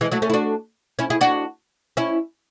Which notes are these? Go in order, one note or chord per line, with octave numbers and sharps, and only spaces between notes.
E3 G#3
F#3 A3
A3 C#4
E4
D4 F#4
C#4 E4
E4 G#4
D4 F#4
C#4 E4